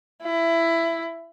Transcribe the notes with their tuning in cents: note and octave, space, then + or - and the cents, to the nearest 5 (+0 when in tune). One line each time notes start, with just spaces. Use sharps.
E4 +15